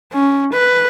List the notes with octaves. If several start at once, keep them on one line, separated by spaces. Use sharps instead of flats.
C#4
B4